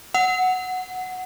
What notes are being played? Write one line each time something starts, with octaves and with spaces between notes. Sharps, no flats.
F#5